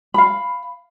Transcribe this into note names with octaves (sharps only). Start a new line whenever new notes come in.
F5 B5